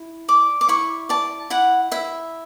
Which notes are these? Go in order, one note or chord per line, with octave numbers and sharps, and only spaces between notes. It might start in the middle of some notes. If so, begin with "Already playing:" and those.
Already playing: E4
D5 D6
D6
E4 C#6
D5 A5
E4 F#5
E4 E5